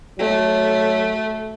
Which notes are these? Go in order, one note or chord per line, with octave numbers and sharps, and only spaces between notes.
F#3 A3